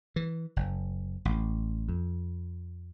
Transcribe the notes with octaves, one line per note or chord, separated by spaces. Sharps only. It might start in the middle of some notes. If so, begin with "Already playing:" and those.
E3
F#1
A1
F2